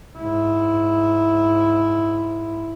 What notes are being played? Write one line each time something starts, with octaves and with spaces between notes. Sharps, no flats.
G#2 E4